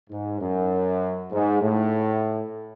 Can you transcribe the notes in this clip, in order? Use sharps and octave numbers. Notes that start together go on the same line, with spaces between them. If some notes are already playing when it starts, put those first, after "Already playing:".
G#2
F#2
G#2
A2